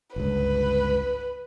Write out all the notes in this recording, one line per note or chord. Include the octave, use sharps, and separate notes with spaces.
G1 C#2 B4